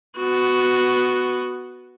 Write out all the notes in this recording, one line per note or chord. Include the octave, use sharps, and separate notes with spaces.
B3 F#4